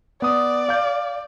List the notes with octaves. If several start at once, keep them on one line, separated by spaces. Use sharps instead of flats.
B3 D5 D#6
F5 G6